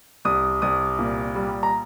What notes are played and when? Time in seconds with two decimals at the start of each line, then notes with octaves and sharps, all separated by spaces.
0.25 C2 D#6
0.62 C2 D#6
0.99 A#2
1.35 G3
1.63 A#5